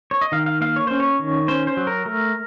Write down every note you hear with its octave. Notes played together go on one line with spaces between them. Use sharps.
C#5
D#5
D#3 F5
F5
A#3 F5
C#5
C#4 C5
C#5
D#3
C#4 C5
C5
F#3
A#4
A3 A#4